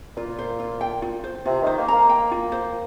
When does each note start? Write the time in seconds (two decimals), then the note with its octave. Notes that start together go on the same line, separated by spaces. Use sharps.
0.17 A#2 F4
0.39 C5
0.60 F4
0.81 G5
1.02 F4
1.24 C5
1.45 C3 F4
1.62 D#3
1.67 C5
1.78 A#3
1.88 A#5
1.93 A#3
2.09 G5
2.31 F4
2.52 C5